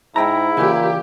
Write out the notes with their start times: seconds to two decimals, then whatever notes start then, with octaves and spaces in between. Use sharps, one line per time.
0.16 G#2 D#4 E4 G5 A#5
0.57 A#2 C#3 E3 G4